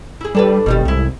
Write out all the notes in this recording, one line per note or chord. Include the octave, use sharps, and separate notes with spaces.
E4 G#4
G3 D4 A4 B4
F#1 B2 D#3 G3
C2 G#2 E4